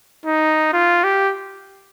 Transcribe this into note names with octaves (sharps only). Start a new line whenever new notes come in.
D#4
F4
G4